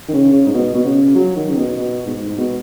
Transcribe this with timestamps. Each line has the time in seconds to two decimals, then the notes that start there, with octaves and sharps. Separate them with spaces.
0.09 D#3
0.14 C#3
0.33 C#3
0.46 G#2
0.54 B2
0.75 B2
0.85 C#3
1.16 F#3
1.36 D#3
1.50 C#3
1.56 B2
1.76 B2
2.06 G#2
2.28 G#2
2.38 B2